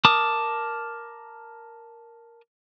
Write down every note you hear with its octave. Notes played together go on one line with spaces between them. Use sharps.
A#4 A5 D6 D#6